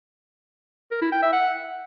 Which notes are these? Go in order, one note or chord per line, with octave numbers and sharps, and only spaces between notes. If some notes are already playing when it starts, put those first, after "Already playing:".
A#4
E4
G5
E5
F#5